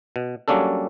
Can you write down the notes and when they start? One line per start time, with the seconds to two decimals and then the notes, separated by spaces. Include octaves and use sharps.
0.16 B2
0.48 F#3 G3 A#3 C#4 D4 A4